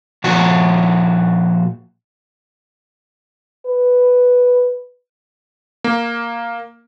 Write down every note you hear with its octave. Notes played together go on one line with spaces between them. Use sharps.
A#2 F3 F#4
B4
A#3